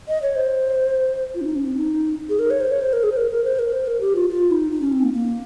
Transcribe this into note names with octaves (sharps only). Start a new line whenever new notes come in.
D#5
C#5
C5
F4
C#4
D#4
C#4
C4
D#4
G#4
A#4
C#5
C5
C#5
C5
A#4
G#4
C5
A#4
A#4
C5
A#4
C5
A#4
G4
F4
F4
D#4
D#4
C#4
C4
A#3
A#3